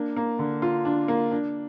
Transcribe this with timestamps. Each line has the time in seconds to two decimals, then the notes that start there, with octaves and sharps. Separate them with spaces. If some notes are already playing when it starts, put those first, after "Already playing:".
Already playing: A#3 D4
0.16 A#3
0.39 D3
0.62 F4
0.85 D4
1.08 A#3
1.31 D4